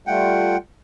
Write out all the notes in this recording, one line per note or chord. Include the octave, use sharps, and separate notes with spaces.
G3 A3 F4 F#5 G5